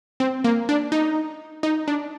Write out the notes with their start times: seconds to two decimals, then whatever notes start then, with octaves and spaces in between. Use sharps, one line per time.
0.20 C4
0.44 A#3
0.69 D4
0.92 D#4
1.63 D#4
1.88 D4